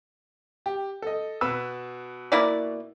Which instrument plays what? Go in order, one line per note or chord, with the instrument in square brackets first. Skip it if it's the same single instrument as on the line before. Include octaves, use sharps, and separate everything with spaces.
[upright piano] G4
A4 D#5
B2 B4 E6
[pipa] A#3 E4 D5